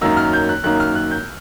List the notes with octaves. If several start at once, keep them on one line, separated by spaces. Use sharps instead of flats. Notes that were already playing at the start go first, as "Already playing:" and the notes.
F#2 D#3 F#3 A#3 D#4 E6
F6
G6
F#6
F#2 D#3 F#3 A#3 D#4 F#6
F6
F#6
G6